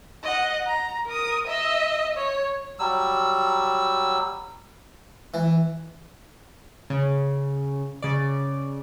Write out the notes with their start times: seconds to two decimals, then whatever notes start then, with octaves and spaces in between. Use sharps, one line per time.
0.23 D#5 F#5
0.67 A#5
1.06 A#4 D#6
1.48 D#5 E5
2.17 C#5
2.79 F#3 G3 E6
5.34 E3
6.90 C#3
8.02 C#3 D5